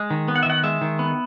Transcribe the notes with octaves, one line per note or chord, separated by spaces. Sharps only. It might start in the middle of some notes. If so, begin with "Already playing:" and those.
Already playing: G#3
D#3
B3
F#5
E5
D#3 F#5
G#3 E5
D#3
B3